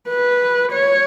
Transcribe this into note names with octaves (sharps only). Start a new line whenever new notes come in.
B4
C#5